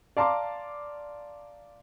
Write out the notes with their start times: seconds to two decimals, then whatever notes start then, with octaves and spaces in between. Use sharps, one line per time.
0.17 D5 F5 A5 A#5 C6 D6